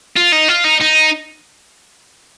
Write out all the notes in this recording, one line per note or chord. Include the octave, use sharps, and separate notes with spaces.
F4
D#4
F4
D#4
D#4